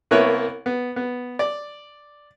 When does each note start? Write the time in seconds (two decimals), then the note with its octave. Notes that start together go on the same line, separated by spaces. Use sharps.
0.11 C2 A#3 B3 E4 B4 C#5
0.66 B3
0.96 B3
1.39 D5